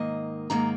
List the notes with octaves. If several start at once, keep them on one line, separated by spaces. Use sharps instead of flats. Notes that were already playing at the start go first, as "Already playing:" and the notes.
Already playing: G#2 D#3 A#3 D#5
G#2 D#3 A#3 A#5